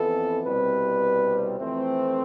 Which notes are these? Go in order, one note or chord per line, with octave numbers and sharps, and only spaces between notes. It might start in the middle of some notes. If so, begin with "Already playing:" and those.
Already playing: F2 E3 B3 A4
C2 B2 G3 C4 B4
F2 E3 A3 C4